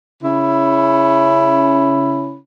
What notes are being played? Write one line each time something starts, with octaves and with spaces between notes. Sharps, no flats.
C#3 C#4 E4 B5